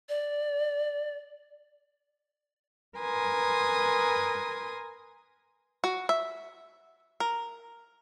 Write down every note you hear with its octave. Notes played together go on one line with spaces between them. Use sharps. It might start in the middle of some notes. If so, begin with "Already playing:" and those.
D5
A#4 B4 G#5 C6 D#6
F#4
E5
A#4